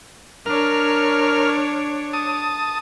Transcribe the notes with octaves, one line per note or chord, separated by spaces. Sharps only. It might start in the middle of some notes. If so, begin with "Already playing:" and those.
D4 A#4 C#5 F6
A5 D#6